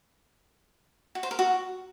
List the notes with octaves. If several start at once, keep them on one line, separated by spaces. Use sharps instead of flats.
F#4
C5
A#4
F#4